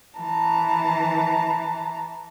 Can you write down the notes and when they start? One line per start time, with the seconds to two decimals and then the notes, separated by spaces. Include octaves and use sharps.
0.18 E3 A5 A#5